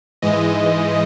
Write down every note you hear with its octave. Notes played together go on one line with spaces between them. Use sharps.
G#2 E3 G#3 D#5